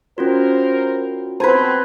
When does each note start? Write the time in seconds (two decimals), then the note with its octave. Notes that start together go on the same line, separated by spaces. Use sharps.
0.18 C#4 F4 F#4 A#4 C5
1.40 F#3 B3 C4 B4 C5 A5 G#6 B6